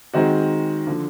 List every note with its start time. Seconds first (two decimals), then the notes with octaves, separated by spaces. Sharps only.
0.14 D#3 G#3 C4 D#4 F#4
0.87 D3 F3